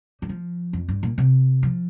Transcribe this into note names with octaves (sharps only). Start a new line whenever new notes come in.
G3
F3
F2
G2
A#2
C3
F3